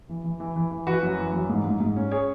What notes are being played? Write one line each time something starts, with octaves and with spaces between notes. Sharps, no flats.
E3
E3
E3
E3
E3
E3 F#4 B4
F#2
E3
F#2
G#2
G#2
G#2
C#4
G#4 C#5